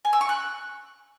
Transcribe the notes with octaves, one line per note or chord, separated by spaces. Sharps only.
G#5
E6
C#6
F#6